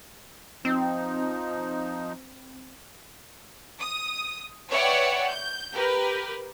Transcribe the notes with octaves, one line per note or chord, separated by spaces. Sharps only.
F3 C4 D#4
D#6
B4 C#5 D5 E5 F#5 G5
G6
G4 A#4 B4